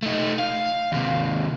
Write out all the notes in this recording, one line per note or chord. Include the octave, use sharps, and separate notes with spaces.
A3 D#4
F5
D#2 C3